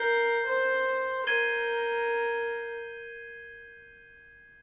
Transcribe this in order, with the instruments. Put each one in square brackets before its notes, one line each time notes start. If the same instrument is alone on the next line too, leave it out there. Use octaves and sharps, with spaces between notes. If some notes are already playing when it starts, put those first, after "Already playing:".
Already playing: [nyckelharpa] A#4 [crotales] G6 C7 G7
[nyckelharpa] C5
[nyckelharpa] A#4 [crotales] G#6 D#7 G7